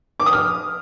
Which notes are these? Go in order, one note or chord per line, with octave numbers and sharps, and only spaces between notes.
D6
D#6
F6